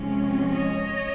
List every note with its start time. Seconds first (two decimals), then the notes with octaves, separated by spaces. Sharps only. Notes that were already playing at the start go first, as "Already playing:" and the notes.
Already playing: C3 F3 G#3 C#4
0.53 C#5 D#5